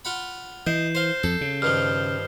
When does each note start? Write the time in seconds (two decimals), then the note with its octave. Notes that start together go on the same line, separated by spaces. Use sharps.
0.05 F4 F#5 B5
0.67 E3 D#5 G6 C7 E7
0.95 C5 F5 C7 G7
1.23 F2 A4
1.41 C#3
1.62 G2 D#3 F3 F6